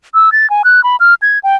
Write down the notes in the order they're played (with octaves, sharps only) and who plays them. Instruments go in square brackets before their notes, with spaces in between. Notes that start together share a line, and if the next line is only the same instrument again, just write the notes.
[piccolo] E6
A6
G#5
F#6
B5
F6
G#6
G5